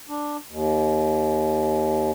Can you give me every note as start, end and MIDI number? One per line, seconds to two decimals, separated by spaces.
0.09 0.37 62
0.50 2.11 39